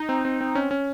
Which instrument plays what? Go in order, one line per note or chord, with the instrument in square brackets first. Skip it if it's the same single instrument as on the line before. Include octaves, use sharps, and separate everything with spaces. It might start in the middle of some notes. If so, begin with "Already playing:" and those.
Already playing: [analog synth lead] D#4
[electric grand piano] C4
C4
C4
C#4
C#4